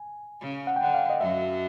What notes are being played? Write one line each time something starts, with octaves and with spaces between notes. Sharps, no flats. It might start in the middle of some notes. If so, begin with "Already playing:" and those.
Already playing: G#5
C#3
F#5
G5
D3 F#5
F5
D#5
F#2 F#3 E5